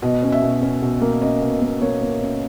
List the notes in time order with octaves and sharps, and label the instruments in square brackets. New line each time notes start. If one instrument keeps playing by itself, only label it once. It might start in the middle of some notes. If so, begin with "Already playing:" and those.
[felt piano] B2 D#5
C#4
E5
B2
C#4
B2
A#3
C#4 D#5
B2
A#3
A#3 C#5
A#3
C#4